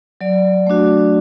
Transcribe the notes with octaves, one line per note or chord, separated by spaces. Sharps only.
F#3 D5
A3 D4 F#4